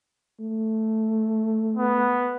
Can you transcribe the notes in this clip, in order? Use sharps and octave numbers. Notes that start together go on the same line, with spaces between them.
A3
B3